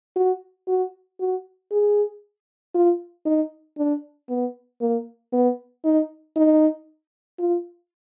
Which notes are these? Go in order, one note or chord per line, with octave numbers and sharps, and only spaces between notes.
F#4
F#4
F#4
G#4
F4
D#4
D4
B3
A#3
B3
D#4
D#4
F4